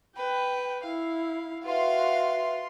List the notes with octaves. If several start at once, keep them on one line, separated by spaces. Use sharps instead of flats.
B4 G5
E4 F5
F4 F#4 B4 E5 F5 C6